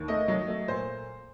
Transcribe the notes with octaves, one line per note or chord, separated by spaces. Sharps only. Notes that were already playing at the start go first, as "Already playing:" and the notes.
Already playing: D#2
A3 D#5
F#3
A3
A#2 C5